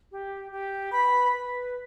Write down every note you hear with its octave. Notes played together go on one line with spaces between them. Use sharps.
G4
G4
B4 B5
B4